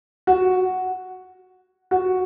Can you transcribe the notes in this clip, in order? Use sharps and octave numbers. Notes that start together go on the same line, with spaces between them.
F#4
F#4